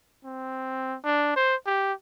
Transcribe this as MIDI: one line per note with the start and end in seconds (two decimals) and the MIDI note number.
0.24 0.97 60
1.05 1.33 62
1.36 1.55 72
1.66 1.93 67